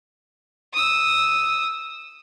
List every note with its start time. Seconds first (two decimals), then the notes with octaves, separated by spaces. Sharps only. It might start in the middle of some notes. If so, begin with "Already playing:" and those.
0.73 D#6 E6